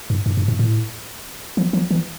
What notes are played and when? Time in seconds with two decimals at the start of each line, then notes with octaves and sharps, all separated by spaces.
0.10 G2
0.26 G2
0.37 G2
0.48 G#2
0.59 A2
1.57 F3
1.73 F3
1.91 E3